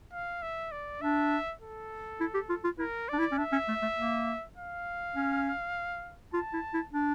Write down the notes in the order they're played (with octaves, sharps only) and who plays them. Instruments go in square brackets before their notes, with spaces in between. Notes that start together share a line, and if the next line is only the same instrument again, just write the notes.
[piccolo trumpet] F5
E5
D5
[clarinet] D4 [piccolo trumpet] E5
[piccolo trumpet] A4
[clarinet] E4
G4
F4
F4
[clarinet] E4 [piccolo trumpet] A#4
[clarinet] D4 [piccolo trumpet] D5
[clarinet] E4
C#4
[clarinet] D4 [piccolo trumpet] E5
[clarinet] C#4
A3
A3
A#3
[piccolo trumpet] F5
[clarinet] C#4
[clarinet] F4 [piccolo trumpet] A5
[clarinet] E4
E4
D4